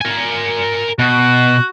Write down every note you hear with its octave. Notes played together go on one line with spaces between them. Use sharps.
A#4 G#5
B2 F#4